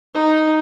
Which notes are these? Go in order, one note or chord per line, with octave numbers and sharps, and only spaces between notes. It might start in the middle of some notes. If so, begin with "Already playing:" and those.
D#4